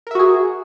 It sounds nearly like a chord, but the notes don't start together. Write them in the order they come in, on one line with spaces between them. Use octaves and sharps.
A#4 E5 F#4 G#4